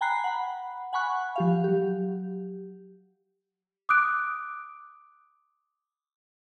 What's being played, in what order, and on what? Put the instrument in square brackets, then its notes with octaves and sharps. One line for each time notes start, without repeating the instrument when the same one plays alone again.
[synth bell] G5 G#5 A#5 B5 F#6 C7
F#5 B5
F#5 G#5 B5 C#6 F#6
F3 G4 F5
F#3 G4
[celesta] D6 D#6 F#6 D7